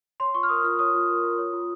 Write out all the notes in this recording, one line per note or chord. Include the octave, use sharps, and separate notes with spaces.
C#5 C6
F4 C#6
F6
A#4 D#6
F4 F6
C#5 D#6
F4
A#4
F4
C#5
F4